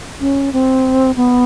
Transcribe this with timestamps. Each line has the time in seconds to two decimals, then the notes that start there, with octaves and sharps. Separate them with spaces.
0.20 C#4
0.53 C4
1.16 B3